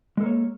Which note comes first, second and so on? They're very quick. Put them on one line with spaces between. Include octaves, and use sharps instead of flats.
G#3 A4 A#3 C#5